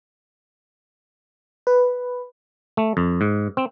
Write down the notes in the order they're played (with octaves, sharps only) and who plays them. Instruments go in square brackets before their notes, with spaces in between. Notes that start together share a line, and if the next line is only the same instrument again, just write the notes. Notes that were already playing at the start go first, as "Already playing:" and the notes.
[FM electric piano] B4
[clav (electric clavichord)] A3
F2
G#2
C4